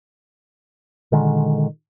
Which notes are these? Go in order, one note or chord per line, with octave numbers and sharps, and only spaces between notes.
A#2 D3 D#3 G#3